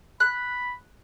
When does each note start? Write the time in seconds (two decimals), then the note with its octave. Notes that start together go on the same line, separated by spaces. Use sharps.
0.20 B5 F#6